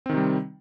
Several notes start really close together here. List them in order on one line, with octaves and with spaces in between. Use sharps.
C4 D#3 C3 G3